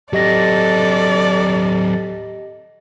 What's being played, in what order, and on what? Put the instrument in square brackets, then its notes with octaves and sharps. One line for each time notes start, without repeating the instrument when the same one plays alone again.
[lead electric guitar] F#3 C4 [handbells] G4 D#5 A#6 [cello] A4 [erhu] D5